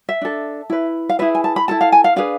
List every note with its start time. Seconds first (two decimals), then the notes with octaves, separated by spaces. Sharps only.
0.09 E5
0.21 D4 A4
0.70 E4 B4
1.09 F5
1.19 E4 G#4 B4 E5
1.35 G#5
1.44 A5
1.56 B5
1.68 E4 A4 A5
1.81 F5
1.92 G#5
2.04 F5
2.16 D4 G#4 B4 F5